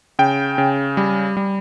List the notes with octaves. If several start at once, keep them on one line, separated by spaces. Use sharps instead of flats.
C#3 G5
C#3
G3
G3